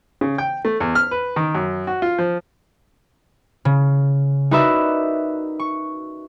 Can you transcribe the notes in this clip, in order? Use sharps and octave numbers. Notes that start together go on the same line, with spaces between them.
C#3
G5
A3
E2
F6
B4
D#3
F#2
F#4
F4
F3
C#3
D#4 F#4 A#4 B4 D5 E5
C#6